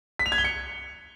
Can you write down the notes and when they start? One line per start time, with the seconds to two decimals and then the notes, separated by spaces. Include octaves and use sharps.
0.19 B6
0.26 F7
0.32 G#6
0.38 G7
0.44 C#7